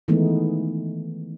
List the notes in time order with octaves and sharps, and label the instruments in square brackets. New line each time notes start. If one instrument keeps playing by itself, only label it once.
[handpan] D#3 E3 G#3 A3 B3 D#4